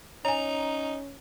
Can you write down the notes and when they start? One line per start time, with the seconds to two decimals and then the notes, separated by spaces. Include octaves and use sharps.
0.25 C#4 D#4 C#5 G#5 A#5